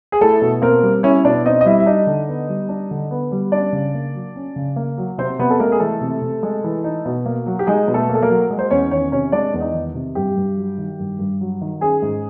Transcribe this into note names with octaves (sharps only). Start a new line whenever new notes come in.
G#4
A3 E4 A4
B2
A#3 C4 A#4
G3
C#4 E4 C#5
B2 D4 D5
C4 D#4 D#5
D#5
G3 E4 E5
E5
D4 D#4 D#5
D3
B3
G3
D4
D3
B3
G3
C#4 D4 D5
C#3
A#3
F#3
C#4
C#3
A#3
F#3
C3 C4 C5
C3 B3 B4
A4
G#3 A#3 A#4
G#4
E3 A3 A4
C3
C3
G#3
E3
D#4
B2
A#3
F#3
G4
G#3 D#4 G#4
B2
A3 A4
A#3
A4
A#3 A#4
F#3
G#3
C5
E2 C#4 C#5
D#3 C#4 C#5
C3 C#4 C#5
G#3 D4 D5
E2
D#4 D#5
D#3
C3
G2 G4 G5
G2
F#3
D#3
G2
G2
F#3
D#3
C#4 G#4 G#5
G#2